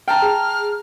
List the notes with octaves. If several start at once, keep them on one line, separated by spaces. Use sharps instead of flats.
G5 A5 A#5 F6
G#4